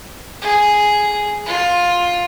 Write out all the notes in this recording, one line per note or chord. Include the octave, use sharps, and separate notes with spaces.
G#4
F4